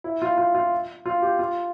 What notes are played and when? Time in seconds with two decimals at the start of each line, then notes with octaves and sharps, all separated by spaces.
0.04 E4
0.22 F4
0.38 F4
0.55 F4
1.06 F4
1.22 G4
1.39 F4